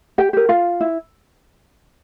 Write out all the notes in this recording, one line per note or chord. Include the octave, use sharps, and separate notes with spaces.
G4 G5
G4 A#4
F4 F5
E4